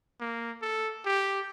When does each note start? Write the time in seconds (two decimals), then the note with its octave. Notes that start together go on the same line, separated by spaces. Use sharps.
0.20 A#3
0.62 A4
1.05 G4